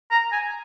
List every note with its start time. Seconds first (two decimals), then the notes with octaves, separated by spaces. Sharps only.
0.11 A#5
0.32 G#5